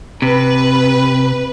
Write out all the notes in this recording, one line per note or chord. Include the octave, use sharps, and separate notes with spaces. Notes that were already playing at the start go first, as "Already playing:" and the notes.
C3 B4